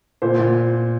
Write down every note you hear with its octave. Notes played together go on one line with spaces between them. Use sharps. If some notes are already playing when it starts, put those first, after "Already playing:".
A#2 C5
A#2